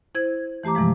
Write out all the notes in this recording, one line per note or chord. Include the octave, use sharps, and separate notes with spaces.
E4 C5 G#6
E3 A3 G4 A#5 D6
G2 C3 E3 F3 G#3